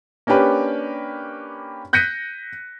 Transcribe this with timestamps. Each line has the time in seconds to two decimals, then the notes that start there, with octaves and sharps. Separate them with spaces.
0.27 A#3 C#4 D4 G4 B4
1.93 F#6 G6 A#6 B6 C#7 D#7